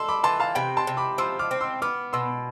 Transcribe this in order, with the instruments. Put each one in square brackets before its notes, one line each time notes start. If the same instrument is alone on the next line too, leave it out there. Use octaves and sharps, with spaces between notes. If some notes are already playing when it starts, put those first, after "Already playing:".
Already playing: [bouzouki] A4 [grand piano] C6 E6
[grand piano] B5 D6
[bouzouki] E3 [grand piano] A5 C6
[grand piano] F5 A5
[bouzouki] C3 [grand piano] G5 B5
[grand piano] A5 C6
[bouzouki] C3
[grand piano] B5 D6
[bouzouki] F3 [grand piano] C6 E6
[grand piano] D6 F6
[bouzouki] C4
[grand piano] C6 E6
[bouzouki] B3 [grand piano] D6 F6
[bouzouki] B2 [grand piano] C6 E6